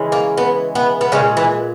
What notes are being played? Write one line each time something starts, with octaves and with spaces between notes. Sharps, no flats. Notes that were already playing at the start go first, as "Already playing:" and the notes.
Already playing: C#3 E3 G#3
A#3
B3
B3
B3
A#2 C#3 G#3 C#4
E3 E4